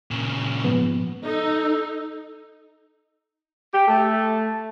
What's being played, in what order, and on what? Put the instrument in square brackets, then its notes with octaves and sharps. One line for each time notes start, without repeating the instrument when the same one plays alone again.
[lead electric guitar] A#2 C#3
[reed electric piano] G#2 F3 B3
[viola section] D#4 [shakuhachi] A4
[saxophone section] G4
A3